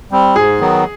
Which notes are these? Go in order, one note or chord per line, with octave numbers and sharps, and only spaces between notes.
G3 C4
G#2 G#4
D#3 F#3 B3